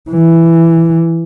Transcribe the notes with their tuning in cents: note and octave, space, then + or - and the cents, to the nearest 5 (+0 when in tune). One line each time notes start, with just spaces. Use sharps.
E3 +5